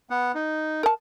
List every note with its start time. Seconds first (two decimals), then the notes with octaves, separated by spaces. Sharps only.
0.10 B3 F#5
0.35 D#4
0.83 A#4 A5